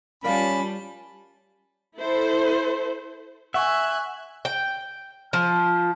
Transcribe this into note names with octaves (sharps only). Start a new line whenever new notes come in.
G3 C#4 F4 A#4 D5 F5 A5 B5
E4 A4 C5
E5 F#5 G#5 C#6 F#6
G5
F3